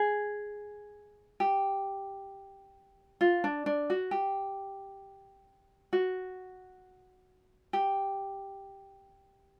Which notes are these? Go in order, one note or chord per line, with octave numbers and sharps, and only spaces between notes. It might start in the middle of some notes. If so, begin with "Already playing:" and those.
Already playing: G#4
G4
F4
D4
D4
F#4
G4
F#4
G4